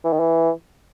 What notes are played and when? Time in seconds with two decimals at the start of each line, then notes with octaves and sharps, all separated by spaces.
0.05 E3
0.13 D#3
0.20 E3